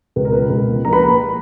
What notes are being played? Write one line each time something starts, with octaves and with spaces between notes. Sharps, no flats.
C#2 B4
A#4
B2 B4
C#2
A#3
A#1 A#4 A#5
B4 B5